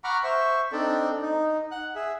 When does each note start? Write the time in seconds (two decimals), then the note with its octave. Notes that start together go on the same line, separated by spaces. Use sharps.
0.04 F#5 A#5 B5 C#6 D6 F6
0.24 C5 E5 C#6
0.72 C4 D4 D#4 A4 D5
1.22 D#4
1.71 F#5 F#6
1.95 G#4 E5